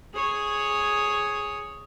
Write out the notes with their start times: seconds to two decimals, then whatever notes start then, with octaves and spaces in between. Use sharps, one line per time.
0.14 G#4 C#5